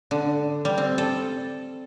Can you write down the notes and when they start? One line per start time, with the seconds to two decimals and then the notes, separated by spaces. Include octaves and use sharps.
0.11 D3
0.65 G3
0.78 C4
0.98 A4